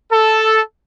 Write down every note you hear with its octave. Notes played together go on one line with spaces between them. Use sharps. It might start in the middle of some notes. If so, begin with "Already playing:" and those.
A4